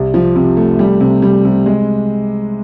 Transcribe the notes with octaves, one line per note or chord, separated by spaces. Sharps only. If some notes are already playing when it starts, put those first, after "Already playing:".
Already playing: C2 C3
F3
C3
A3
G3
C3
G3
C3
G#3